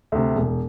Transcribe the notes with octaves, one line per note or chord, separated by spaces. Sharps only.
D2 C3
E1